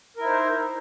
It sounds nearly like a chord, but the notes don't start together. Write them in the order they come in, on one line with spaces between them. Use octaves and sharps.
A#4 E4 D#4 C5